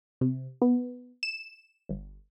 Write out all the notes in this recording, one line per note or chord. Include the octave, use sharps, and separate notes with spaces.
C3
B3
E7
G1